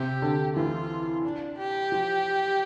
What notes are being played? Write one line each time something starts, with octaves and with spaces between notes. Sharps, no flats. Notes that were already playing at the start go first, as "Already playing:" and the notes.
Already playing: C3 G4
D3
E3 F4
D4
G4
F3